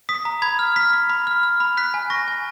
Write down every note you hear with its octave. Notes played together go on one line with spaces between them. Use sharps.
D#6 B6
A#5
B5 G#6
F6
F6 B6
B5
B5
F6
F6
B5
F#6 B6
G#5
C#6 A#6
G#5